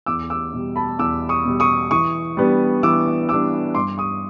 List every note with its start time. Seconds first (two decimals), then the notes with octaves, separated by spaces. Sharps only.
0.06 E2 D6 E6
0.30 D6 E6
0.53 B2 G3
0.76 A5 B5
0.99 E2 D6 E6
1.29 C#6 D#6
1.45 B2 G3
1.60 C#6 D#6
1.91 E3 C#6 D#6
2.37 G3 B3 D4
2.83 E3 D6 E6
3.29 G3 B3 D4 D6 E6
3.75 G2 C6 D6
3.98 C#6 D#6